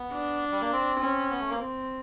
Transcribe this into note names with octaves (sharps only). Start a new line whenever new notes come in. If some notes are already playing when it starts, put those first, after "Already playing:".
Already playing: B3
D4
G3
A#3
C4
C#4
B3
A3
A#3
C4